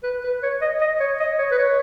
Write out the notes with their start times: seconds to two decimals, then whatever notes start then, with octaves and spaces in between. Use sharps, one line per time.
0.03 B4
0.24 B4
0.43 C#5
0.62 D#5
0.81 D#5
1.00 C#5
1.20 D#5
1.39 C#5
1.51 B4
1.58 C#5